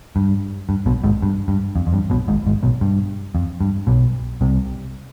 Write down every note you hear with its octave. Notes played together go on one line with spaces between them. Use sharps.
G2
G2
B1 B2
G#1 G#2
G2
G2
F2
F2
G2
B1 B2
G#1 G#2
G#1 G#2
B1 B2
G2
F2
G2
B1 B2
C2 C3